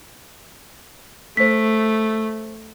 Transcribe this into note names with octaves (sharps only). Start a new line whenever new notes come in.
A3 C5 B6